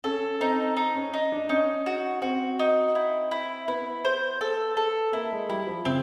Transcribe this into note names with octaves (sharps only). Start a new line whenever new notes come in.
C#4 A4
C4 D#4
D#4
C#4
D#4
D4
C#4 D#4
F#4
C4 F#4
D#4
E4
E4
B3 E4
C5
A4
A4
A#3 E4
G#3
G3 E4
F3
C#3 C4